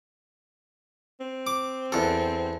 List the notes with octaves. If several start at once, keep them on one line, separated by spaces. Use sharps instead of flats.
C4
D6
E2 A4